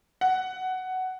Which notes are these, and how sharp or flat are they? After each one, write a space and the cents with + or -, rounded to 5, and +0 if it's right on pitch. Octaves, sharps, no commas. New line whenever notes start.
F#5 +10